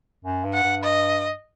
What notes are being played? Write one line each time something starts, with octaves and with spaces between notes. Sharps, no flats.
F#2
G2
F#5
G2
D#5